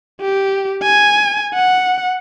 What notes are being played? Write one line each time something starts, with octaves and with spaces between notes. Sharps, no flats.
G4
G#5
F#5